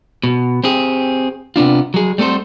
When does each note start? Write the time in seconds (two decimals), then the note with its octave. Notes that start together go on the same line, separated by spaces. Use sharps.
0.24 B2
0.64 C4 G4 G#4
1.56 C3 B3 D4 F4
1.94 F#3 G#4
2.18 G3 A3 C4 A4 C5